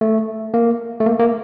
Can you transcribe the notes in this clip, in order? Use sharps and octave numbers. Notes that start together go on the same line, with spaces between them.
A3
A#3
A3
A#3
A#3